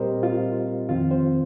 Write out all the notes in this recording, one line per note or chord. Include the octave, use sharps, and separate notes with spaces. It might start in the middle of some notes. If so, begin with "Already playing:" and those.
Already playing: A#2 G3 C4 G4 A#4 C5 D#5
F4
F2 D#3 C4 F4
C5